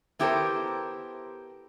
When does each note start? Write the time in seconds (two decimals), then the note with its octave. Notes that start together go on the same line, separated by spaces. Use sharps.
0.19 B3 E4 G4 A4 A#4 C5